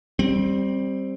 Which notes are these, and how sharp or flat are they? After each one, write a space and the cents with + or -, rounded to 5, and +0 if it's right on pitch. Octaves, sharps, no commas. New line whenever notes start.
G3 +0 C4 +15